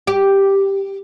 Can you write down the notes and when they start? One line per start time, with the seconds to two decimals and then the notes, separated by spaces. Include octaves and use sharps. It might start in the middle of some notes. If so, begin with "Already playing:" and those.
0.07 G4